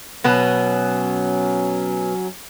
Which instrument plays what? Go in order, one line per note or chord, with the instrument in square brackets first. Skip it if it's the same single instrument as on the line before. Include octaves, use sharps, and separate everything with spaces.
[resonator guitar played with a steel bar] B2 B3 [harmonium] F#3 C#4